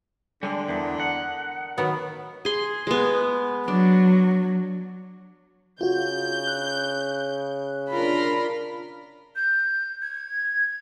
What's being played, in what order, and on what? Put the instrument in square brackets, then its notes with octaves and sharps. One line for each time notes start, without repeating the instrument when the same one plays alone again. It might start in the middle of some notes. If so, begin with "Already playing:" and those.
[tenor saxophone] D3 [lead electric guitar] G3 G#3 [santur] D4 A4 C6
[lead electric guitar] E2 [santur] A#4 D#5 A5
[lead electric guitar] F#5
[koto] D#3 B3 [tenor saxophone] F#3
[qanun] G#4 C6
G#3 B3
[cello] F#3 [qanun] D4
[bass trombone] C#3 [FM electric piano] F4 F#4 [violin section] G6
[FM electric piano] F#6
[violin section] D4 B5 [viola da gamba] F4 A#4
[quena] G6
G#6